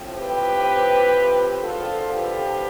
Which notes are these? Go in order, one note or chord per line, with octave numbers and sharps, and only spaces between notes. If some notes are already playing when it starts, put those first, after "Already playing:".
Already playing: A2 F3 C4
G4 B4
E2 D3 F3 F4 A4
G4 B4